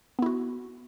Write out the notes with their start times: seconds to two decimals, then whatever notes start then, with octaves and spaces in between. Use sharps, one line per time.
0.19 B3
0.22 E4
0.26 F#4